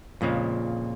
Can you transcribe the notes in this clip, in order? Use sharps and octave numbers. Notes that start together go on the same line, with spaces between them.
F2 A#2 C#3 F3 G#3